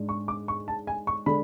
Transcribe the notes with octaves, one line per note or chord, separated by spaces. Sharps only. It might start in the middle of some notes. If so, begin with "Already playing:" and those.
Already playing: G#2 G#3 D4
C#6
D6
C#6
A5
G#5
C#6
D3 G#3 D4 B5